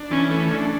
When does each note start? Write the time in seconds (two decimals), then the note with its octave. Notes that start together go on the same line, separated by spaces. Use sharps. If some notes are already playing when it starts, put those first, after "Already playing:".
Already playing: D4
0.10 E3 C#4
0.30 A3
0.51 D4